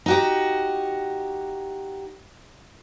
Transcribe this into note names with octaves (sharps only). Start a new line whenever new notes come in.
D#4 F#4 G4